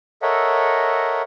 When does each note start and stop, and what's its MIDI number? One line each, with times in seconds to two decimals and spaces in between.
0.22 1.22 69
0.22 1.22 70
0.22 1.22 73
0.22 1.22 75
0.22 1.22 76
0.22 1.22 78